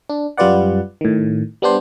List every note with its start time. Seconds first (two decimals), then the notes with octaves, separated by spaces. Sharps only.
0.10 D4
0.37 F#2 G3 F4 B4 D5 F#5
1.01 A2 D#3
1.62 G3 B3 D4 C5